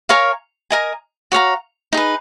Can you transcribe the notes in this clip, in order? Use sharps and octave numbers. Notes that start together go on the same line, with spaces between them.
A#4 C#5 F5 G#5
A#4 D#5 G#5
F#4 C#5 F5 A#5
D#4 G#4 B4